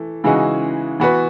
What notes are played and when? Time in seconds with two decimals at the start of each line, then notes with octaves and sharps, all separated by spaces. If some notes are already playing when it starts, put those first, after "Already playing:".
Already playing: E3 A3
0.24 C#3 E3 G#3 D#4 F#4
1.00 E3 B3 F#4 B4